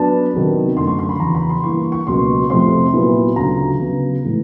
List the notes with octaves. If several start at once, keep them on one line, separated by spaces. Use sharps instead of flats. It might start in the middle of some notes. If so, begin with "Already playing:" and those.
Already playing: F#3 B3 D4 A5
C3 D#3 F#3 B3
F#2 D3 F#3 A3 C6
C#6
C6
B5
E2 C#3 F#3 A#5
B5
C6
G2 E3 G3 A#3 C#6
C#6
C#2 B2 F#3 A#3 C6
F2 C3 F3 A3 C4 C6
A#2 F#3 B3 E4
D2 C#3 F#3 A#5
C#3 F#3 B3
A2 E3 G#3